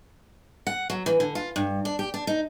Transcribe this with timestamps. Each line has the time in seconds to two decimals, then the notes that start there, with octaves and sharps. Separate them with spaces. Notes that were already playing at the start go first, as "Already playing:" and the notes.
0.67 F#5
0.90 F#3
1.06 E3
1.20 D3
1.35 F4
1.56 G2
1.85 D4
1.99 G4
2.14 D4
2.27 D#4